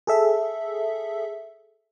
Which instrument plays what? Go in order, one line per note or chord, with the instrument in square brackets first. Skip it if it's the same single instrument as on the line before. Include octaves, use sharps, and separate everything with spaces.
[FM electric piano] G#4 A4 E5